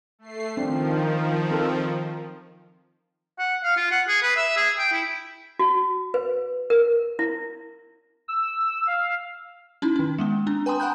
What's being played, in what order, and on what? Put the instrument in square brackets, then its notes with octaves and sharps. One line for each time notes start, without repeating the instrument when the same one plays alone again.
[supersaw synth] A3 C7
[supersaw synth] D#3 F3 [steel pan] C4 D4
[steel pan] C4 A4 A#4
[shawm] F#5
F5
F4
F#5
G#4
B4
E5
G#4
G5
E4
[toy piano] F#4
B4
A#4
E4
[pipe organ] E6
F5
[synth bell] C#4 D#4 E4
D#3 C#4
G#3 A#3 B3
C4 D4
B4 G5 G#5 A#5 C6 D#6
F#5 G#5 A#5 B5 F#6 G6